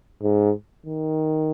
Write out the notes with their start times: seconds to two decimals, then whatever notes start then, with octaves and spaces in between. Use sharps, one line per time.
0.22 G#2
0.86 D#3